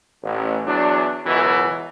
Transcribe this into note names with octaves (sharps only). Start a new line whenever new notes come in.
A1
E2 F#3 D4
C#2 F#2 B2 E3